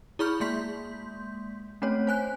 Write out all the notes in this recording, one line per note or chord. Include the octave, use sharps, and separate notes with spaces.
E4 G#4 B5 C#6 F6 G6
G#3 A#3 C6 G6 B6
A3 C4 C#4 C#5
C5 G#5 F#6